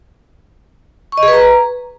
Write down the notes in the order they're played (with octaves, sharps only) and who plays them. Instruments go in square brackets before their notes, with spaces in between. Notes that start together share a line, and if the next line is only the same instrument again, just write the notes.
[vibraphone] C#6
D#5
G#4
B4
A#5